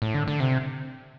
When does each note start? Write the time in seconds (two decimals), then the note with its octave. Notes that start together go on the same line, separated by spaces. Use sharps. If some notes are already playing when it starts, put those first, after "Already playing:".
0.02 A2
0.14 D3
0.28 D3
0.40 C3